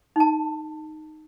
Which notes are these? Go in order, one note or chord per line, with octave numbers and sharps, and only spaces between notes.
D#4 A5